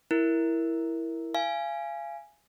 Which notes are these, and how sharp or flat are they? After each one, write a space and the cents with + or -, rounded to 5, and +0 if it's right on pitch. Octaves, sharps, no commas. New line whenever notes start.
E4 +0 A#4 +0
F5 -35 G#5 +0